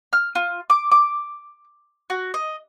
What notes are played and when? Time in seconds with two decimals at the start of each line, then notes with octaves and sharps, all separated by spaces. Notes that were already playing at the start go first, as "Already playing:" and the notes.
0.13 F6
0.35 F4
0.70 D6
0.92 D6
2.10 F#4
2.34 D#5